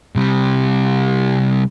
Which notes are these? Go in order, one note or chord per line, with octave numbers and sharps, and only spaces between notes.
C3 G3